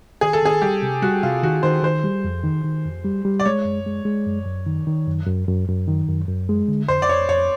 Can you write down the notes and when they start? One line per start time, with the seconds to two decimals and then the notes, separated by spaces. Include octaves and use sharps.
0.21 D#3 G#4
0.33 A4
0.42 D#3 G#4
0.62 G3 G4
0.82 C3
1.02 G3 F#4
1.23 C3 F4
1.43 D#3 F#4
1.63 D#3 C5
1.83 D#3 C5
2.03 G3
2.24 F2
2.44 D#3
2.64 D#3
2.85 F2
3.04 G3
3.25 G3
3.40 D5
3.45 G#3 C#5
3.65 F#2
3.86 G#3
4.05 G#3
4.26 F#2
4.46 F#2
4.66 D#3
4.87 D#3
5.07 F#2
5.27 F#2
5.48 F#2
5.68 F#2
5.88 D#3
6.08 F#2
6.28 F#2
6.49 G#3
6.68 D3
6.88 F2 C5
7.02 D5
7.09 F2 C#5
7.29 F2 C#5